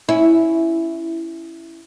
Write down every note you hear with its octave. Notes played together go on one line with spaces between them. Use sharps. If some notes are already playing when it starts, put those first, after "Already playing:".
C#4 E4